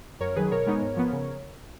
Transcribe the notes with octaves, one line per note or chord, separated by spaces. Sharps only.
F#2 A#4 C#5
D#3 F#3 G#4 B4
B2 A#4 C#5
G#3 B3 D#4
G#2
F3 B3
C#3